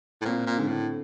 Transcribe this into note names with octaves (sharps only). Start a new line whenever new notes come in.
A2
A#2 C4
A#2
G#2 D3
A2